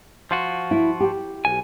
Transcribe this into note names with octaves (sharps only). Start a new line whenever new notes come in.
F3 F4 F#4
E4
G4
B1 G#5